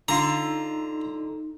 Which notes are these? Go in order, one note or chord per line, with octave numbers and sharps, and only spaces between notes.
D3 D#4 F4 A#5